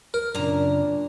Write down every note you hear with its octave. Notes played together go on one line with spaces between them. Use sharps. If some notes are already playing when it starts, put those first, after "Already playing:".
A#4
F#2 A#2 C#3 D4 A#5